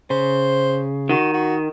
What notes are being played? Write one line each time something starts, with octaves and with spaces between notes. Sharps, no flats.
C#3 C5
D#3 F#4
F#4